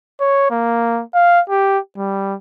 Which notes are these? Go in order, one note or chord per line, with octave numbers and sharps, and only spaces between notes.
C#5
A#3
F5
G4
G3